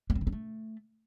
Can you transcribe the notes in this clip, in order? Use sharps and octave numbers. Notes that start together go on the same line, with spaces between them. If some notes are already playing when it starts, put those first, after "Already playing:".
A#3
C4
C#3
C4
A3